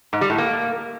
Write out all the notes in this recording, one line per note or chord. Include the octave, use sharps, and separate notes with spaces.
G#2
G3
A2
A#3